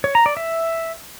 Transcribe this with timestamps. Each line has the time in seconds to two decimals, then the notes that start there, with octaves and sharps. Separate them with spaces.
0.04 C#5
0.15 A#5
0.26 D5
0.37 E5